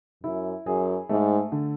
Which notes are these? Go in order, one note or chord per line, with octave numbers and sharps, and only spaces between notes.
F#2 E4
F#2 G#4
G#2 A3
D3